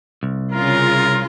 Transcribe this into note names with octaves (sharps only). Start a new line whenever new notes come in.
C2
C#3 F4 A#4